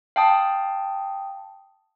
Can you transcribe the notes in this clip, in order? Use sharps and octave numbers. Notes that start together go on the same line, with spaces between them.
F5 G5 A5 D#6